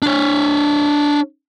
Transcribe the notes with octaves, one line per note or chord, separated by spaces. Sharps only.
D4 C#5